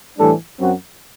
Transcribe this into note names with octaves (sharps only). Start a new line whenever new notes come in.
A2 E3 G3 D4 A4
F#2 F#3 C4 F#4